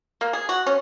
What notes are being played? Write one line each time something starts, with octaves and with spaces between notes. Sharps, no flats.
A#3
G#4
F#4
C#4